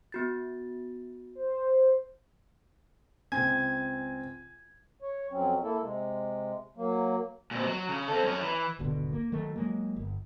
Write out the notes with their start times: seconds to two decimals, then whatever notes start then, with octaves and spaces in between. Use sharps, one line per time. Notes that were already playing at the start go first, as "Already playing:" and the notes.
0.12 B3 F#4 A6
1.35 C5
3.32 C#2 C4 G#5 G#6
5.02 C#5
5.31 F2 F#3 C4 C#4
5.63 A#3 E4 A4
5.82 C3 G#3
6.77 F#3 A#3
7.51 A#2 C4
7.66 F#3
7.89 C#3
8.08 C4 A4
8.24 F#2 C#4
8.42 E3
8.79 D1 G#1 B2 D3
9.13 A#3
9.32 D#3 F#3 A3
9.56 F#3 G#3 A#3
9.96 G1